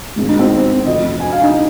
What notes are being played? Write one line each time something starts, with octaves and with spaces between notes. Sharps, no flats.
G#1 G#2 D#3 G#3
D#4
C4
F1 F2 F3 D#5
G#5
F5
D#4